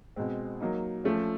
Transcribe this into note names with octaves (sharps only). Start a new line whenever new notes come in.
B2 G#3 C4
F#3 A#3 D#4
F3 A3 C#4